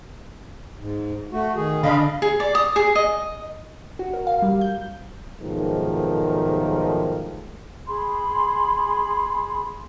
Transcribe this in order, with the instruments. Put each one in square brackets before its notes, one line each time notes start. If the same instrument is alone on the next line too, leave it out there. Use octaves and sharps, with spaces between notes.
[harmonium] G#2
A3 F#4
D#3 G#4
[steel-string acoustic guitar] D3 [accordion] D#5 F5 B5
[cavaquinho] G#4
D5
D#6
G#4
D#5
[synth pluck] F#4
A#4
F5
G3
G6
[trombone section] B1 G#2 D#3 F3 A3 A#4
[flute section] G#4 B5 C6